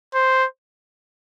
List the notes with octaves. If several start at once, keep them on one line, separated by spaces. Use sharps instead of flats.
C5